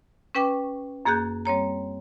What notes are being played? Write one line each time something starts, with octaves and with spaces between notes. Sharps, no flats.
C#4 B4 G5 C#6 D6
F#2 A#3 G#4 F#6 G6
G3 C4 C#5 A#5